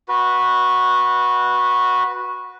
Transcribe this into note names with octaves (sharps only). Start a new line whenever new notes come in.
F#4 B4